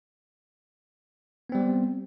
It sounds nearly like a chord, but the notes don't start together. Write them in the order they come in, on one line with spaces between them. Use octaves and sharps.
B3 C4 G3